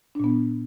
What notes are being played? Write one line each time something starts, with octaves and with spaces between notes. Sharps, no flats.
A#2 B3 D4